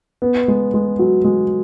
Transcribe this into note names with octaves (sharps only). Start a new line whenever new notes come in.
B3
G#3
G#3
F#3
G#3